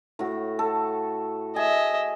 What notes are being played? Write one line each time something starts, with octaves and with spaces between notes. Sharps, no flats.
A2 F#4
A4
G#4 D#5 E5